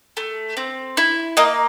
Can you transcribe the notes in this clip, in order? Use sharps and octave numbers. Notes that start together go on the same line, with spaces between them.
A3
C4
E4
A#3 D#5